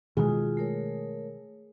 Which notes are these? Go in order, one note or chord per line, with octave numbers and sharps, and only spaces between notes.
B2 D#3 G#3 F4 F#4 G#4
A3 A#4 C#5